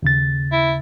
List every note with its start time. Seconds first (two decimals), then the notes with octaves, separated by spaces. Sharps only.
0.02 D#2 C#3 A6
0.52 E4